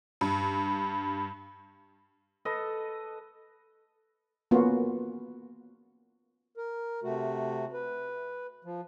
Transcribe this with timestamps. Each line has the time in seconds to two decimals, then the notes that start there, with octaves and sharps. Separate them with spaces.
0.21 G2
2.45 A4 B4 D#5
4.51 A#3 B3 C#4 F4 F#4
6.57 A#4
7.03 C3 A3 F#4
7.73 B4
8.64 F3